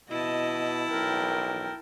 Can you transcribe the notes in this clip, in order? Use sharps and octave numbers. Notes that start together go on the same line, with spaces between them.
B2 E4 D#5 A5
B1 A#4 G5